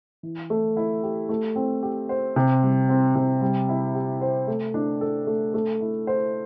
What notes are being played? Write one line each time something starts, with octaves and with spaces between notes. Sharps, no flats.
E3
A3
E4
G4
A3
C4
G4
C5
C3
G3
C4
C3
G3
E4
G4
C5
A3
D4
A4
A3
A3
E4
C5